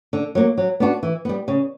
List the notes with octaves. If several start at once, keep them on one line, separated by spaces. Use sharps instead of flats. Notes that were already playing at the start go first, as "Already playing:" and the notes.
D3
F#3 A#3
F#3
B3 D4 F#4
E3
G3 B3
C#3